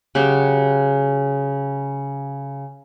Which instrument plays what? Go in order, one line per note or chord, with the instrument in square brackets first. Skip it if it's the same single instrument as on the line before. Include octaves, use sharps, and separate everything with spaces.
[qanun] C#3 F#3 F#4 G4